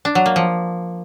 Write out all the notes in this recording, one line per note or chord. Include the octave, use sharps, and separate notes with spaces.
D4
F#3
A#3
F3